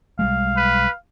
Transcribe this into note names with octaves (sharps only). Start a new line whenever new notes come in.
B1 G3 G#3 F5
B4